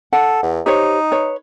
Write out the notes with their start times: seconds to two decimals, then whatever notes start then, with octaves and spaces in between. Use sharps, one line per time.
0.13 A4 F#5
0.43 E2
0.66 D#4 G4 C5 C#5
1.11 B4 C#5